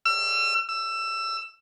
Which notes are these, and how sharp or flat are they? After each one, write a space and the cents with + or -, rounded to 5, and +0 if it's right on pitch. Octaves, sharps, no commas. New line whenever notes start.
E6 +40
E6 +20